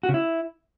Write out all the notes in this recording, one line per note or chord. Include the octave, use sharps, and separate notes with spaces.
F#4
C#3
E4